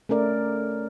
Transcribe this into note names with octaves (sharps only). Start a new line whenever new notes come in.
A3 C#4 A#4 D5